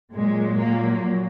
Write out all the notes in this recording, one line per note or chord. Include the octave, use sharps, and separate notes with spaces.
A#2 F#3 G#3
A#2 A#3